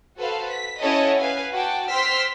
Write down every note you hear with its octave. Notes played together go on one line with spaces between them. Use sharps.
F#4 A4 B4 C5 F5
B6
C#4 E4 F#4 A4 C#5 D#5
B4 F5 G#5
F#4 F#5 G5 A5 D6
C5 G5 C6 E6 F6 B6